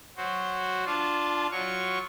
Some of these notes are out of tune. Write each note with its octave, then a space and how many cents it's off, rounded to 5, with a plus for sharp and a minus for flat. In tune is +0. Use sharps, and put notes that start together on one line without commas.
F#3 +0 F#4 +0 C5 +0
D4 +0 F4 +0 A5 -25
F#3 +0 F4 -5 C#6 +0